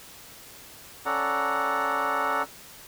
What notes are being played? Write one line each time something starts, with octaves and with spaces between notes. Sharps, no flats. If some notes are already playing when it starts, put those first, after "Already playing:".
C#4 A4 D5 F#5 A#5